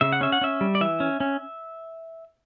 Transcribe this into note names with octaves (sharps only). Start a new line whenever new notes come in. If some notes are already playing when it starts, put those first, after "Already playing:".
C#3 E5
F#5
C#4 E5
F#5
C#4 E5
G3
D5
E3 E5
C#4
C#4